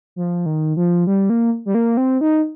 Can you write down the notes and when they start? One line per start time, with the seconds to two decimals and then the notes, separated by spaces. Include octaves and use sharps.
0.16 F3
0.46 D#3
0.77 F3
1.07 G3
1.30 A#3
1.66 G3
1.75 A#3
1.97 C4
2.21 D#4